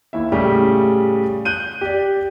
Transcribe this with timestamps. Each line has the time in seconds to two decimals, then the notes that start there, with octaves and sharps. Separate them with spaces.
0.13 D#2 E4 E5
0.32 A2 C#3 G3 G4
1.45 F#6 G6 D#7
1.81 G4 D5